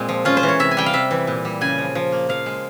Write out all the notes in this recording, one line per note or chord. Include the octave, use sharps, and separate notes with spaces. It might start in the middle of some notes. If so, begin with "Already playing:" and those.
Already playing: A#2 G#3 C4
F3
C#4 F4
C5
E3
C#5
C3 E5
G#5
G3 G5
F5
C3 E5
E3
A#2
G3
C#3 G#5
F3
F3
A#3
F3 F5
G#3